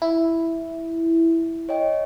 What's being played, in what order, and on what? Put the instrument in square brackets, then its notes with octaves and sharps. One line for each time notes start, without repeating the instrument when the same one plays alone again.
[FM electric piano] E4
[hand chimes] C#5 D#5 G5